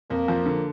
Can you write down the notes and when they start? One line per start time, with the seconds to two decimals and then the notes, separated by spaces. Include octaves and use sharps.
0.10 F2 A#3
0.28 F3
0.46 D3